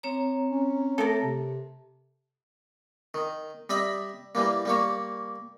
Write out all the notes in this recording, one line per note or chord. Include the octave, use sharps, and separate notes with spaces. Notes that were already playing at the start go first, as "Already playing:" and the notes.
C4 C#5 A#5
C#4
A3 A4 A#4
C3
D#3
G3 D#5 E5 B5
E3 G3 A#3
G3 A#3 C#5